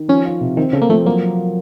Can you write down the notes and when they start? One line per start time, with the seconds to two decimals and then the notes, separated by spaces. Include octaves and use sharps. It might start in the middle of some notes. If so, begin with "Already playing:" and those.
Already playing: D#3
0.08 F3 C#4
0.25 F4
0.41 C3
0.57 D#3 C4
0.73 C#3 A4
0.82 A#3
0.89 F3 A3
1.05 F#3 A#3